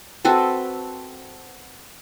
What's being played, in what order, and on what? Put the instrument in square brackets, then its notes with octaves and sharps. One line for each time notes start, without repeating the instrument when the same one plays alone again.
[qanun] C4 F#4 A4 B4